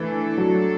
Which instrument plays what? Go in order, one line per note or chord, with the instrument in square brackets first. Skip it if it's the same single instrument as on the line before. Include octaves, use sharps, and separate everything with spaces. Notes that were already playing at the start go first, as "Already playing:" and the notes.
Already playing: [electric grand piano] E3 [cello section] A3 D4 A4
[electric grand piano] F#3